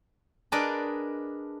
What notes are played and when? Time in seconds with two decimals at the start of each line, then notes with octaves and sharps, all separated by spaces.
0.52 D4 G#4 A#4 B4 D5 D#5